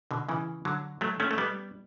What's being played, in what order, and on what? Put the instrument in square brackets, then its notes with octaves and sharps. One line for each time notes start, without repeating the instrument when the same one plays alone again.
[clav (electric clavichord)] B2 D3
C#3 E3
D3 F#3
F#3 A3
A3 C#4
A3
G3 B3